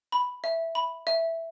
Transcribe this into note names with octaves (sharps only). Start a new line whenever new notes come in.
B5
E5
B5
E5